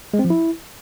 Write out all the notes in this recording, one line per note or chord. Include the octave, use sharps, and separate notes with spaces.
G#3
C4
F3
E4